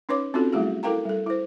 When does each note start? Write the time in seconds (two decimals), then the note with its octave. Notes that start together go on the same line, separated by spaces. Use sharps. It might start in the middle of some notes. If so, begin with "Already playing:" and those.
0.09 C#4 D#4 B4 C#5 D6
0.34 C4 C#4 D#4 F4 F#4 A4
0.53 F#3 G3 A3 E4 F#4 G#4
0.83 E4 A4 A#4 F5 G5 A#5
1.05 G3 A4
1.26 E4 C5